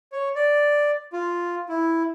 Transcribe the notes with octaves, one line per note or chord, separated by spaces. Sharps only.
C#5
D5
F4
E4